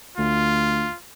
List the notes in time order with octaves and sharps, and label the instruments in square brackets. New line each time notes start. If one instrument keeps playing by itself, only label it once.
[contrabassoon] D2 [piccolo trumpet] F4